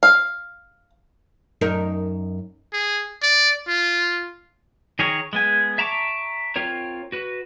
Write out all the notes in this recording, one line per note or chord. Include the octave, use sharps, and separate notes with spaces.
F5
F#2 D#4 A#4
G#4
D5
F4
D#3 G#4 A#4 C#5
G#3 B3 G#5
E5 A5 A#5 C#6 D6
C4 F4 A#4 C#5
F#4 B4